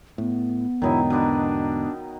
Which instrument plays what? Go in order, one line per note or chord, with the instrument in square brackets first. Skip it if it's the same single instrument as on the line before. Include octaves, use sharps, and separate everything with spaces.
[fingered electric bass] A2 [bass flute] B3
[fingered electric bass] E2 G#2 D3 [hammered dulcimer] D#3 F#3 D#5 [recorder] E4
[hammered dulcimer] B2 B4 [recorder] D4